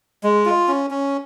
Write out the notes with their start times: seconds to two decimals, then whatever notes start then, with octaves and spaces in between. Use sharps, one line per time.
0.23 G#3
0.45 F4
0.68 C#4
0.91 C#4